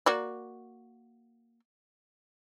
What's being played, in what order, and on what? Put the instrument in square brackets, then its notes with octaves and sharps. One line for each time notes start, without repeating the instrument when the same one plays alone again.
[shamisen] A#3 F#4 D5